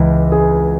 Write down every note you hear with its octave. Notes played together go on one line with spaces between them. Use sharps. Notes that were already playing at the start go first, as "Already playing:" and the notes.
Already playing: C#2 E3
G#4